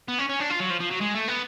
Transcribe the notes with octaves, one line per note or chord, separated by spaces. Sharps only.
B3
C#4
C#4
D4
F4
F#3
F3
F3
F#3
G#3
A3
B3